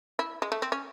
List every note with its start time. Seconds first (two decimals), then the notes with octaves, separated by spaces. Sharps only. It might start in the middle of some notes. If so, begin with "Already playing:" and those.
0.19 E4
0.42 G#3
0.52 A3
0.62 C4
0.72 C#4